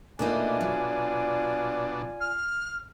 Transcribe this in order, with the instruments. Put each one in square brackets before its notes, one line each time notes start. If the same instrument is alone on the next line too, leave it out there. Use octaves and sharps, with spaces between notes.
[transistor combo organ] B2 D4 [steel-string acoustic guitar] A3 A#3 D#4 [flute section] F4 D5 G#5
[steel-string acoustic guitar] F#3
[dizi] F6